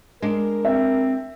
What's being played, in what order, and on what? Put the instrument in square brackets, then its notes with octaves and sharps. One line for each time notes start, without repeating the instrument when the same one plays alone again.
[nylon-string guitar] G#3 D4 [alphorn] A#4
[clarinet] C4 [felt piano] E5